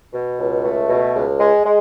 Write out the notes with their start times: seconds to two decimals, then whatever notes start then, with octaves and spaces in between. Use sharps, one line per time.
0.13 B2
0.39 C#2
0.64 A3
0.89 B2
1.15 C#2
1.40 G#3
1.65 G#3